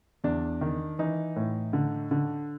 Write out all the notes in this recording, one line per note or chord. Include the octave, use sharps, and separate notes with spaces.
E2 D4
D#3
E3 D#4
A2
D3
D3